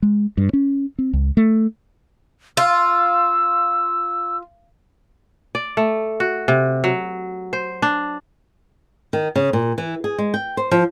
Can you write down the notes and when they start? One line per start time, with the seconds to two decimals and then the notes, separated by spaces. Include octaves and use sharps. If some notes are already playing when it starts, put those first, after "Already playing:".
0.02 G#3
0.37 G2
0.53 C#4
0.99 C4
1.13 C#2
1.37 A3
2.57 F4 E6
5.55 D5
5.77 A3
6.20 F#4
6.48 C3
6.84 F#3
7.53 C5
7.82 D4
9.13 D#3
9.36 C#3
9.53 A#2
9.78 E3
10.04 G#4
10.18 G#3
10.34 G5
10.57 C5
10.71 F3